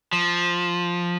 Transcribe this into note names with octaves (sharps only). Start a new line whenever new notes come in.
F3